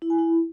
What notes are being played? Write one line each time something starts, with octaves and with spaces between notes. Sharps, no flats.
E4
G#5
E4